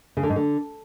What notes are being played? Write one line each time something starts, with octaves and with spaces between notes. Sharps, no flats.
C#3
D3
G#2
D3